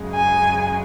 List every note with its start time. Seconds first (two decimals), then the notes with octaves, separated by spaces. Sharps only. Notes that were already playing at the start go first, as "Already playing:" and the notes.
Already playing: F#2 C#3 G#3
0.12 G#5